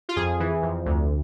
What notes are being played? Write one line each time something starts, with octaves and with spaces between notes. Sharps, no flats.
F4
F2 G#4
E3
F2
D2